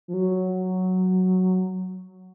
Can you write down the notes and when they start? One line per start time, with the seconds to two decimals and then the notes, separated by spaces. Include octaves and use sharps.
0.08 F3
0.14 F#3